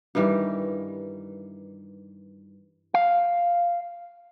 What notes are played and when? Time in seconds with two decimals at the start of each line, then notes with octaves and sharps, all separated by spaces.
0.15 G2 D#3 E3 G3
2.94 F5